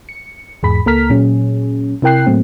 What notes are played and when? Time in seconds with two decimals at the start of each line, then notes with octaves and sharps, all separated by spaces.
0.09 C#7
0.63 E2 G#2 G#4 B5 B6
0.86 C#2 A#3 A4 A#5 F6 B6
1.10 A#2 F#3 C#4 G#4
2.02 C3 E4 A#4 G5 F#6 C7
2.27 A2 F#3 A3 A#3 C4